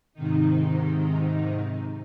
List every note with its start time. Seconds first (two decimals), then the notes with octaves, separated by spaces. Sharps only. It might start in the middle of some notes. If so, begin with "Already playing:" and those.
0.13 G#2 C3 D#3 D#4